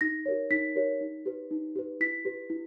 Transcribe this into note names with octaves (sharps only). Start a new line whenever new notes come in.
D#4 A#6
G4 A#4 C#5
D#4 B6
G4 A#4 C#5
D#4
G4 B4
D#4
G4 B4
E4 B6
G4 B4
E4